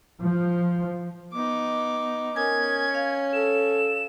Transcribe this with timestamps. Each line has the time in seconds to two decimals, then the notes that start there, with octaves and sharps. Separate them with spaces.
0.20 F3
1.33 B3 D#4 D6
2.36 C#4 A#4 G#5 D#6 G#6
2.90 C#5 F5
3.33 A4 E7